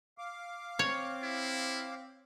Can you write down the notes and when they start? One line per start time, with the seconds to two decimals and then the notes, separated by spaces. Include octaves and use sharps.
0.18 F5 D6
0.79 C4 C#5
1.23 E4